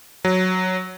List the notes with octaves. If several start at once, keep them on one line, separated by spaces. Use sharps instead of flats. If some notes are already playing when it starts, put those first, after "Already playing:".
F#3